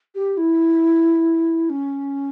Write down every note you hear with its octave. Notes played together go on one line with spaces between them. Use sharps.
G4
E4
C#4